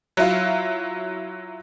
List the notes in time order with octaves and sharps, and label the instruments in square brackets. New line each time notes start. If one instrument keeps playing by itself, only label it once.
[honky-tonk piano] F#3 E4 F4